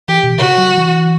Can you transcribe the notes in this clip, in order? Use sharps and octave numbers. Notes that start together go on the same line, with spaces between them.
E3 G4
B2
C#3 F#4
F#3
E3